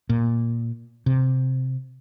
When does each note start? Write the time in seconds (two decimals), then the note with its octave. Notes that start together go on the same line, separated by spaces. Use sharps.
0.09 A#2
1.06 C3